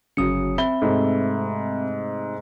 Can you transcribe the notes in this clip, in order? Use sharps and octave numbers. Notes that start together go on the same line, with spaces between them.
G1 C#3 F#3 D#6 C#7
C4 E5 B5 G7
G#2 C3 A3